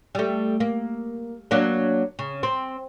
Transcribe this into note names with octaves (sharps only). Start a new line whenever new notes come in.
G3 A3
A#3
F#3 A#3 D4
C#3
C4